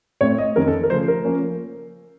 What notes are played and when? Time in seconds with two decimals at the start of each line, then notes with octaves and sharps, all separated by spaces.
0.21 A2 A3 C4 C#5
0.38 D#5
0.55 F2 D#3 A#3 C#4 A#4
0.68 A4
0.84 A#4
0.90 C#3 F3 A3 C5
1.08 A#4
1.25 F3 A#3 C#4